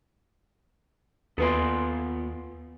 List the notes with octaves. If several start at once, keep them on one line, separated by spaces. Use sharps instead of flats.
D#2 B3 F4 A4 B4 G#5 C6